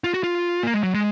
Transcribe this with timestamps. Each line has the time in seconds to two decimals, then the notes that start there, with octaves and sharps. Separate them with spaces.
0.04 F4
0.14 F#4
0.23 F4
0.63 A#3
0.74 G#3
0.83 F#3
0.94 G#3